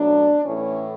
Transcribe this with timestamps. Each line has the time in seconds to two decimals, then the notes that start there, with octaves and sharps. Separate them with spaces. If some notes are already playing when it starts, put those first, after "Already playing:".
Already playing: B2 F#3 A3 D4
0.44 A2 E3 A3 C#4